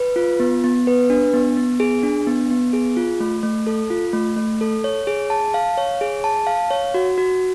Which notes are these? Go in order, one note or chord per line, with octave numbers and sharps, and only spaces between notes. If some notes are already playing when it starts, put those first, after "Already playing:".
Already playing: B4
F4
B3
B3
B4
D4
B3
B3
G#4
D4
B3
B3
G#4
F4
A3
A3
A4
F4
A3
A3
A4
C#5
G#4
A5
F5
C#5
G#4
A5
F5
C#5
F#4
F#4